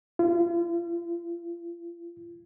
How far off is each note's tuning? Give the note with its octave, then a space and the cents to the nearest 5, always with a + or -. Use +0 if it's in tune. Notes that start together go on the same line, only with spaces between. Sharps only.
F4 -40